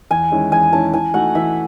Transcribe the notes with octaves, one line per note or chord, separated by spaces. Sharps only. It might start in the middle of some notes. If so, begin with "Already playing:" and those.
E2 G#5
D#3 G#3 C#4 E4
E2 G#5
D#3 G#3 C#4 E4 A5
E3 G#5
A3 D#4 F#4 F#5
E3 E5